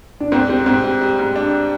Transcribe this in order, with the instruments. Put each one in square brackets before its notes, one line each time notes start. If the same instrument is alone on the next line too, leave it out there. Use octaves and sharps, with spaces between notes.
[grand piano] D4
[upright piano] G#2 [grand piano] C4
[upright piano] G3 [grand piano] C4
[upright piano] G#2 [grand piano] C4
[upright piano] G3
G3
G#2
D4